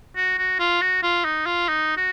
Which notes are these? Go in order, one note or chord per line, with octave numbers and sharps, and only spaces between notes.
F#4
F#4
F4
F#4
F4
D#4
F4
D#4
F#4